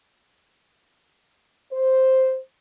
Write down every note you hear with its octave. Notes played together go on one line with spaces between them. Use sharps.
C5